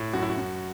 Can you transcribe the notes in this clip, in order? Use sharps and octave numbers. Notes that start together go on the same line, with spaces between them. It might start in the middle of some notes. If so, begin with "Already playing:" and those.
Already playing: A2
F#2 F#4
E4
F#4
F#2